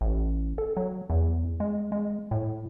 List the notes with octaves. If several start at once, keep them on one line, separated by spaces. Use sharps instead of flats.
A1
A4
F#3
E2
G#3
G#3
A2